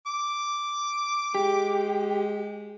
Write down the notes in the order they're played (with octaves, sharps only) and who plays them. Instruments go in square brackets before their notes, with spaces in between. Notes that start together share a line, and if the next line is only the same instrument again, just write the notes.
[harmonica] D6
[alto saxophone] G#3 [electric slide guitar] G4